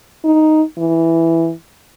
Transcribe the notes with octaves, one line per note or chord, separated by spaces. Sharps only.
D#4
E3